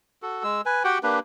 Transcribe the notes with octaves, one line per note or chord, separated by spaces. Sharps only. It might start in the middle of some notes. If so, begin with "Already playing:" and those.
F#4 A4
G#3 E6
B4 G#5
F#4 G4 F#5 G5
A#3 D4 G4 B4